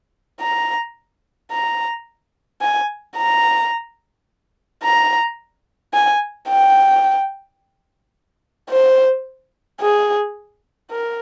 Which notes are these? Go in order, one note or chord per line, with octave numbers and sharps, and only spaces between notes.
A#5
A#5
G#5
A#5
A#5
G#5
G5
C5
G#4
A#4